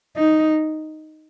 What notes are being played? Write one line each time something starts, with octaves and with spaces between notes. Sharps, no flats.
D#4